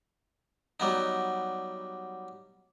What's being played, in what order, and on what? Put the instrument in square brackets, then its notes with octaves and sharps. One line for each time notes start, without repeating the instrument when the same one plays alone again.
[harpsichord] F#3 G3 B3 D#4